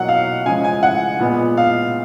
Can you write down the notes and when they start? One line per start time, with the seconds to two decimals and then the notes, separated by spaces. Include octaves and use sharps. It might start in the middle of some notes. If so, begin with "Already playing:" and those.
Already playing: B2 F#3 A#3 F#5
0.08 F5
0.46 C#3 F3 G#3 G#5
0.64 G#5
0.83 F#5
1.20 A#2 G#3 B3
1.57 F5